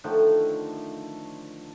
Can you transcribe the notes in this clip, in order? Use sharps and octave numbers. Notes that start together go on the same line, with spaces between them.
D3 D#3 F3 A3